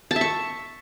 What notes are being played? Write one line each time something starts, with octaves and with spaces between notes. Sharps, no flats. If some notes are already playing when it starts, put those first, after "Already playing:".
A5
E5
C#6